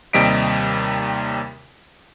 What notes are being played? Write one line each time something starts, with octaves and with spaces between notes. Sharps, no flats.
D#2 C3 G3 D#5 B6 D7